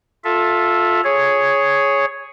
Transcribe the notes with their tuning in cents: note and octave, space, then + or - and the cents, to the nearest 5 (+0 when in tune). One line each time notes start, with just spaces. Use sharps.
F4 +20 A4 +0 E5 +0
G#4 +0 C#5 +0